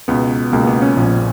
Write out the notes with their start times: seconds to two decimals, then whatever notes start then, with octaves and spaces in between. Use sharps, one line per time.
0.08 C#2 B2 B3
0.52 C#2 B2 A#3
0.67 B3
0.82 C#4
0.97 A#1 A#2